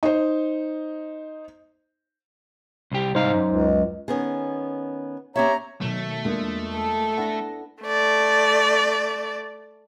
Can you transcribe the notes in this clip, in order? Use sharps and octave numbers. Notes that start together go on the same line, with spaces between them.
D#4 C5
C2 G4
C2 G#2 D#4 C5 F5
F#2
C#2
D#3 B3 C#4 G#4
C4 G4 C#5 E5 A#5
B2 D#3 F#3 A3
E2 G#3 A#3 D4 F4
A4
B3 D4 E4 F#5 A#6
A3 D5